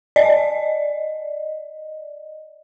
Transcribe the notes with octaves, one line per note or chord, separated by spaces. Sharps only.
D5 D#5